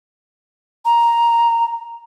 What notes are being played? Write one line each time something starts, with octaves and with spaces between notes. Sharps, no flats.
A#5